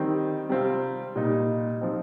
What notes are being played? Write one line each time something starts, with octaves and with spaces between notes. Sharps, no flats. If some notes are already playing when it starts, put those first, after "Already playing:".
Already playing: D#3 G3 C4 D#4
C3 G3 C4 F4
A#2 G3 D#4
F3 C4 D#4